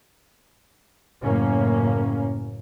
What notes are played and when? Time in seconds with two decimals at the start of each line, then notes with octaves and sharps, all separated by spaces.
1.23 F#1 A2 A#3 C#4